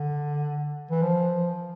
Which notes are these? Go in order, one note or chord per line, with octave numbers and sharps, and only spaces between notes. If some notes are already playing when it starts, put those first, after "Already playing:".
Already playing: D3
E3
F3